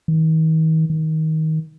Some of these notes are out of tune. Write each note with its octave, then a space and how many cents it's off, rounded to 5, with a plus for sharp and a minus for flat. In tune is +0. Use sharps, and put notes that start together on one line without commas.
D#3 +40
D#3 +20